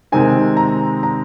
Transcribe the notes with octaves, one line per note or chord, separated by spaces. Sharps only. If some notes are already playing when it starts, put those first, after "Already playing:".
C3 D#3 G#3 C4 D#4 G#5
A#5
A#5